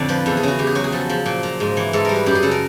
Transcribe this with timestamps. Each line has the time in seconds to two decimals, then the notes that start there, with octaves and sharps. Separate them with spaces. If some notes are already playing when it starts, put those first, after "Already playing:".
Already playing: F2 A2 D3 D5
0.09 F3 B4
0.26 E2 A4
0.37 G#4
0.43 C#3 F#4
0.59 E2 G4
0.67 G#4
0.75 F#3 F#4
0.84 G#4
0.92 F3 A4
1.09 F3
1.26 A#2
1.43 A#2
1.60 G#2
1.77 E3
1.93 G#2 A4
2.05 G3 A#4
2.16 B4
2.26 F#2 G4
2.35 G#4
2.43 C#3 A4
2.51 A#4